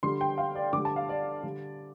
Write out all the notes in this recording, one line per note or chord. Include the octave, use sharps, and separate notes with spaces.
D3 G3 C6
G5
F5
D5
D3 G3 D6
A5
F5
D5
D3 G3